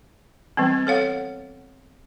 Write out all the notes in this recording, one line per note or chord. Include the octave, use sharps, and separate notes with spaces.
E3 G3 B3 C4
A4 C#5 F5 F#5